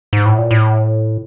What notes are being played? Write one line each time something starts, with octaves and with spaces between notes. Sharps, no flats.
G#2
A2
A#2
A2